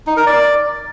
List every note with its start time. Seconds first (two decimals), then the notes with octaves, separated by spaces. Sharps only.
0.07 D#4
0.17 A#4
0.26 D5